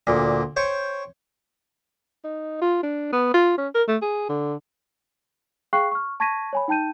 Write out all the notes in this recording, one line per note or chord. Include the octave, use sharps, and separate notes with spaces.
D2 A#2
C5 C#5 G5 C#6
D#4
F4
D4
B3
F4
C#4
A#4
A3
G#4
D3
G#4 F5 G5 C#6 F#6 C7
C#6 F6
A5 C#6 G#6 A#6 B6 D#7
C#5 G#5 B5
D#4 G5 A5 G6 D#7